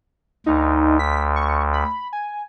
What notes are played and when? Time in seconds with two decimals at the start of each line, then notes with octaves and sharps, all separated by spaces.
0.46 D2 D#4
0.99 B6
1.36 C#6
1.73 B5
2.13 G#5